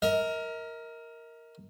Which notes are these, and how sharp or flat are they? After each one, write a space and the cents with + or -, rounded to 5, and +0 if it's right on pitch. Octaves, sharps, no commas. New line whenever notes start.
A#4 +0 D#5 +40